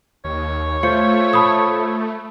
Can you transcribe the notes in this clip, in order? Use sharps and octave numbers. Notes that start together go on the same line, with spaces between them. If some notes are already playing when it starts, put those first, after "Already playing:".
D#2 C#5
A3 F4 C5 C#7
A5 B5 D#6